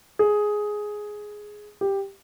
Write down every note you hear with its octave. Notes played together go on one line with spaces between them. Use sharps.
G#4
G4